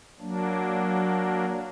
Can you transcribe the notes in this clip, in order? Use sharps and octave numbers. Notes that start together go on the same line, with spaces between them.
F#3 A#3 D4